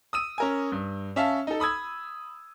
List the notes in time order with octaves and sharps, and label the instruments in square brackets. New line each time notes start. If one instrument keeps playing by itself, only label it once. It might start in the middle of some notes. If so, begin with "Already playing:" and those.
[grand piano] D#6 E6 D#7
C#4 A#4 G#5
G2
C#4 E5 F5 A5
D#4 A4
B5 D#6 E6 G#6